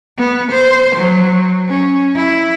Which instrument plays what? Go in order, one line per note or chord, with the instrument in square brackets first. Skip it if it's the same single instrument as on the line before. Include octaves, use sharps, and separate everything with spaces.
[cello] B3
C5
F#3
C#4
E4